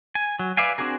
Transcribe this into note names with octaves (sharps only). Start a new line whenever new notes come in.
G#5
F#3
B4 D5 E5 F5 G#5
C4 D4 F#4 G#4 A#4